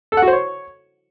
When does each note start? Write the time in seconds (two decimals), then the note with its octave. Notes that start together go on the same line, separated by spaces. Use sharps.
0.12 A4
0.17 F#5
0.22 F#4
0.28 C5
0.33 C#5